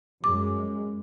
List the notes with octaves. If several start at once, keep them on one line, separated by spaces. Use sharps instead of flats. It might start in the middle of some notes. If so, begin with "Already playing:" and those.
F#2 G#3 D6